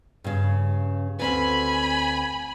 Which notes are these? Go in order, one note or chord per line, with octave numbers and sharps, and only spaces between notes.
G2 C#3
D2 C4 B4 G#5 B5